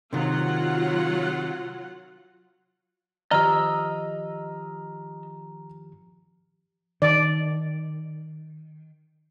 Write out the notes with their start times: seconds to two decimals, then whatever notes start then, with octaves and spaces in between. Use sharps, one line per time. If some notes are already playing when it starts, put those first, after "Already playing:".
0.13 C3 D#3 F#3 F4 F#5
3.31 D#3 F3 G4 D#5 A#5 E6 F6
7.02 D#3 D5